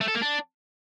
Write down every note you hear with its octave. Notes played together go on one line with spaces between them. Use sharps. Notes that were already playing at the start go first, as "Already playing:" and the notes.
A3
A4
A#3
D4